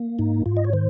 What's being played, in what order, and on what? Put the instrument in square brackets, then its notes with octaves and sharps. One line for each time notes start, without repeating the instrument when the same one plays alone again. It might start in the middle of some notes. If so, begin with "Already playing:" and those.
Already playing: [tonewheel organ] A#3
G#2 D#4
G#2 F4
D#5
C#5
D#3 C5